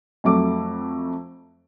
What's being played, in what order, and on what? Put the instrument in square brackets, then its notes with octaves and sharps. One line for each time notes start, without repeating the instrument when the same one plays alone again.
[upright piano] F2 F#3 A3 D6